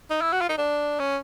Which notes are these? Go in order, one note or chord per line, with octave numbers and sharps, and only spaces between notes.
D#4
E4
F#4
F4
D#4
D4
C#4